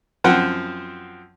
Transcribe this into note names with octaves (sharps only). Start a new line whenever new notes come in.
F#2 F3 C4 F#5